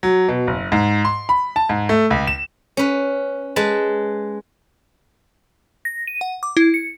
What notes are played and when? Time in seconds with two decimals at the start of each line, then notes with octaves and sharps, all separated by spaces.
0.03 F#3
0.28 B2
0.47 F#1
0.72 G#2
1.05 C6
1.29 B5
1.56 A5
1.69 G#2
1.89 A3
2.10 C#2
2.27 E7
2.77 C#4 B4
3.56 G#3 B4 A5
5.85 A#6
6.07 D#7
6.21 F#5
6.43 D6
6.57 E4
6.74 C#7